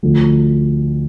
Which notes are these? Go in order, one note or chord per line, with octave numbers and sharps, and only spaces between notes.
D2 D3 F3